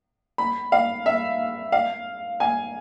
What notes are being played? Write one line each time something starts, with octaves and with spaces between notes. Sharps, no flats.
B5
F5
E5
F5
G#5